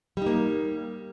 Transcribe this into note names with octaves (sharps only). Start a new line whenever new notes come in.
G3 A#3 D#4